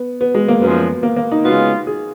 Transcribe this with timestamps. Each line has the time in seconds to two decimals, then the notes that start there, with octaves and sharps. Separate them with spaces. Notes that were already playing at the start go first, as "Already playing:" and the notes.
Already playing: B3
0.21 B3
0.35 G#3
0.48 A#3
0.61 F#2 F3 G#3 B3
1.03 A#3
1.16 A#3
1.32 D#4
1.44 C#3 G#3 B3 F4 F#4
1.87 G#4